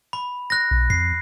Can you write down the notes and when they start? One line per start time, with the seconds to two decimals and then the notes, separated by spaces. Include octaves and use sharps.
0.13 B5
0.50 F#6 A#6
0.71 B1
0.90 F2 C7